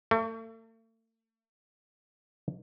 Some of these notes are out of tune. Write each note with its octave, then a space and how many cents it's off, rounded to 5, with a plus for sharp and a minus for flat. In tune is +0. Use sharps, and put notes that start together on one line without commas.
A3 +40